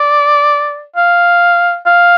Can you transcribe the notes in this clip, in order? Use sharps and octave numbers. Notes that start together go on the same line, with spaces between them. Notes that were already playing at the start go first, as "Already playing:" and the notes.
Already playing: D5
F5
F5